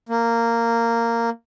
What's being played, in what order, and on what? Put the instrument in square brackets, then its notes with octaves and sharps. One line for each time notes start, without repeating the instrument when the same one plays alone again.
[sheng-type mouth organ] A#3